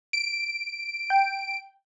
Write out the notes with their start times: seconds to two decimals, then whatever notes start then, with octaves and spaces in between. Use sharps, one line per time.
0.13 D7
1.10 G5